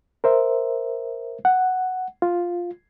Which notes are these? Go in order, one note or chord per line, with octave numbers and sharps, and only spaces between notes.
A#4 C5 E5
F#5
F4